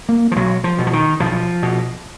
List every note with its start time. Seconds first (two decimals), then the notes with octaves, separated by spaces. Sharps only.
0.09 A#3
0.32 F3
0.36 B1 F#3
0.64 F3
0.78 B2
0.87 F3
0.93 D#3
1.20 B1 F3
1.63 B2